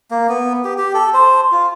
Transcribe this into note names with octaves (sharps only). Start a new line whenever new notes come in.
A#3
B3
G4
G4
A4
C5
F4